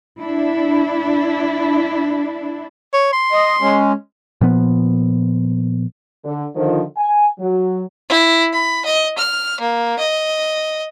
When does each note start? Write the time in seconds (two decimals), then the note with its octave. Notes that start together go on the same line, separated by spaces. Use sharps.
0.19 D4 E4
2.93 C#5
3.13 C6
3.32 D#5
3.61 G#3 C#4
4.41 A#2 F3 B3
6.24 D3
6.56 D3 D#3 F3
6.97 G#5
7.40 F#3
8.09 E4
8.53 B5
8.85 D#5
9.18 F6
9.60 A#3
9.99 D#5